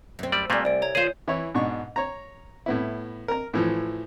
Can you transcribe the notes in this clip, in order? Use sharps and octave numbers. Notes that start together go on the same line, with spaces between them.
F#2 C4
G3 D5 E6
A#2 G3 A3 A#3 C4 G#5
C2 D5 D7
C#5 A#5 G#6
D#3 F4 G#4 C5 C#5 G6
E3 E4 C#5
G#2 B2 D4 C#6
C#5 A#5
A2 B3 E4
A#4 A#5
A2 E3 F3